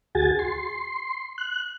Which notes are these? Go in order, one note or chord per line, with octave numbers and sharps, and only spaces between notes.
D2 F#4 G#4 G#5 A6
C6
F#6